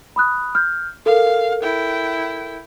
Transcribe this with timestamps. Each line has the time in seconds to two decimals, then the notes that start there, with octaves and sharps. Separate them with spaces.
0.16 B5 D#6 F#6
0.55 F6 G6
1.06 A4 A#4 F5
1.63 E4 G5